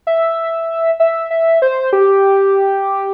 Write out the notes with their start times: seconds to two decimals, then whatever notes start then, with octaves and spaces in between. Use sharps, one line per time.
0.07 E5
1.00 E5
1.31 E5
1.62 C5
1.93 G4